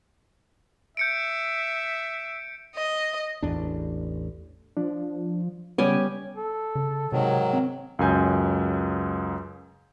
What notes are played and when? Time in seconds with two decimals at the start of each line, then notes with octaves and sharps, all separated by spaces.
0.97 E5 G6 C#7 D7
2.76 D#5
3.43 A1 E2 D4
4.77 F3 D4
5.78 C#3 G3 B3 C#4 G4 G#5
6.35 A4
6.75 C#3
7.12 G#2 C3 D#3 F#3
7.53 C4
7.99 C#2 F#2 G#5 G6